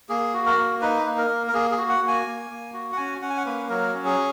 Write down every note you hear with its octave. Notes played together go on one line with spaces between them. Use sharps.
A#3 G#4
F#4
A#4
A#3
D#4 B4
A#3
A#4
A#3
A#4
A#3 G#4
G#4
F#4
F#5
A#3
G#5
A#3
A#3
F#4
F#5
C#4 G#5
C#4 F#5
G#5
F#5
A#3 B4
F#3 A#4
C#4
G#4